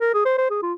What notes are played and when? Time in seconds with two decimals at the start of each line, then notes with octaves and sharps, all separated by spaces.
0.01 A#4
0.14 G#4
0.25 C5
0.38 C5
0.50 G#4
0.62 F4